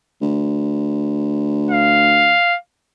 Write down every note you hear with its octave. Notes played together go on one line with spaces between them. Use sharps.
D2
F5